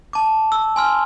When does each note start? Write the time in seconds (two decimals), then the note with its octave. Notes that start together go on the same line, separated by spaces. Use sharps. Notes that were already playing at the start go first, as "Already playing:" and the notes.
0.13 A5 D6
0.52 E6
0.76 G#5 C6 F6